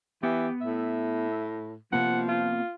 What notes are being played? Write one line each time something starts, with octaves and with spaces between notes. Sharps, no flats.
E3 B3 G4
A2 E5
C3 F3 A#3 B3 F#5
F4